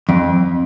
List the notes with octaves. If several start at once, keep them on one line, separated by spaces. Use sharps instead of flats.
F2